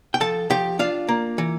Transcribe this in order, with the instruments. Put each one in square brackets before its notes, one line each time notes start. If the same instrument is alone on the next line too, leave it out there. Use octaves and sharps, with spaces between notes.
[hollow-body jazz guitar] G5
F3 A4 A5
F3 G4 G5
D4 F4 F5
A#3
E3